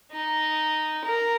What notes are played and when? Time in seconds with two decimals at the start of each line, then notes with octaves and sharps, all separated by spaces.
0.12 D#4
1.05 A#4